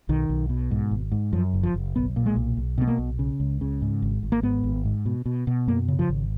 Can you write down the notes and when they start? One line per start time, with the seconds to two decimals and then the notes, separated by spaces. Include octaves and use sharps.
0.09 B1 D#3
0.29 B1
0.49 B2
0.71 G#2
0.91 G#1
1.12 G#2
1.32 F#2 F3
1.54 F#1
1.63 F3
1.74 F#1
1.95 B1 B3
2.16 A#2
2.26 G#3
2.36 B1
2.57 B1
2.78 B2 B3
2.87 A#3
2.98 B1
3.19 C#3
3.40 C#2
3.61 C#3
3.82 G#2
4.02 G#1
4.23 G#1
4.32 A#3
4.43 G#2 B3
4.64 G#1
4.85 G#2
5.06 B2
5.26 B2
5.47 B2
5.67 F#2 A#3
5.88 C#3
5.99 F3
6.09 G#1